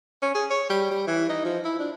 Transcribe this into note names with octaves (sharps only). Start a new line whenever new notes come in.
C#4
G#4
C#5
G3
G3
E3
D#4
F3
E4
D4